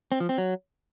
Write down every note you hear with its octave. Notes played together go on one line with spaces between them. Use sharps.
C4
F3
C4
F#3